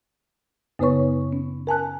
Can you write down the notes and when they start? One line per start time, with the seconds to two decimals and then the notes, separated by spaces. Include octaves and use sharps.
0.79 F#2 C#3 B3 B4 C#5 C#6
1.32 C#4
1.67 A#4 G#5 A5 F#6